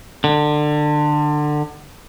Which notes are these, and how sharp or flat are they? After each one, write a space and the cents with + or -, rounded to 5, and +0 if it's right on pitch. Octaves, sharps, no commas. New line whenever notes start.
D3 +25